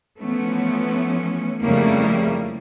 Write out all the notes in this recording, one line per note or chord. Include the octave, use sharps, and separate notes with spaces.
E3 F3 A3 B3 C#4
F2 C#3 G3 A3 A#3 E4